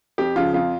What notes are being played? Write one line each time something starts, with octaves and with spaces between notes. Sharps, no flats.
F2 G4
C#3 F3 F4
F2 F4